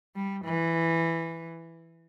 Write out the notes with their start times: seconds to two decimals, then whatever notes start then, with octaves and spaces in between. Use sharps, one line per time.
0.16 G3
0.45 E3